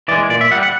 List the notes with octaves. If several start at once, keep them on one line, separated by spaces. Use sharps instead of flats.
E3 G#3 D5
A#2 D5
E5
G3 F#5
F#5